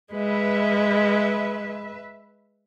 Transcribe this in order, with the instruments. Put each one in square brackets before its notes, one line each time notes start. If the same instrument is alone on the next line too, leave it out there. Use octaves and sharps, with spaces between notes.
[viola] G#3 [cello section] B4 E5